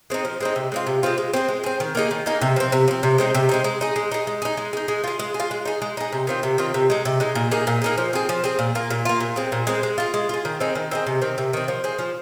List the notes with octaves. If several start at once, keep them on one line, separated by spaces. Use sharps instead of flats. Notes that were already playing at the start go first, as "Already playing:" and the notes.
G#3 C4 D#4
F3
G#3 C4 D#4
C3
G#3 C4 F4
C3
G#3 C4 F4
G#3
C4 G#4
G#3
C4 G#4
D#3
A#3 D#4 G#4
D#3
A#3 D#4 G#4
C3
F3 C4
C3
F3 C4
C3
G#3 C4 D#4
C3
G#3 C4 D#4
G#3
D#4 G#4
G#3
D#4 G#4
G#3
D#4 G#4
G#3
D#4 G#4
G#3
F4 G#4
G#3
G#4
F4
G#3
D#4 G#4
G#3
D#4 G#4
C3
D#3 C4 F4
C3
D#3 C4 F4
C3
G#3 D#4
C3
G#3 D#4
A#2
A#3 D#4 G#4
A#2
A#3 D#4 G#4
F3
C4 G#4
F3
C4 G#4
A#2
A#3 F4
A#2
A#3 F4
A#2
G#3 C4
A#2
G#3 C4
G#3
F4 G#4
G#3
F4 G#4
D#3
C4 D#4 G#4
D#3
C4 D#4 G#4
C3
D#3 C4
C3
D#3 C4
F3
C4 G#4
F3